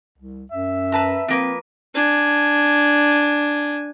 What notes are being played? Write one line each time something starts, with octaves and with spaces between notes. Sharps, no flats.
C2
F#2 E5
B4 A5 A#5
F3 A#3 C4 B4
D4 G#5